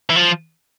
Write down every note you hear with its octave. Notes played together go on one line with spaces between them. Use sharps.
E3
F3